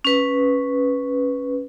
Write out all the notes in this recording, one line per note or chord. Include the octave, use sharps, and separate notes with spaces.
C#4 B4